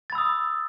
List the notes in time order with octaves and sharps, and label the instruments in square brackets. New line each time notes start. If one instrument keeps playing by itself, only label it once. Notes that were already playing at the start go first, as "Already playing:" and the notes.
[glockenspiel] A6
B5
E6
D#6